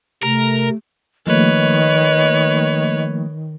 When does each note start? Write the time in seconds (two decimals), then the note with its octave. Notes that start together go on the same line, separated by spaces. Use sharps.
0.23 C3 A3 A#4
1.27 D#3 F3 A3 A#3 B4 C#5 D#5